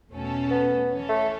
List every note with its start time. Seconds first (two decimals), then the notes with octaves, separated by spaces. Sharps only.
0.11 E2 B2 A3 C#4 A4
0.51 B3
0.90 E3 C#4 A4 C#5
1.09 A3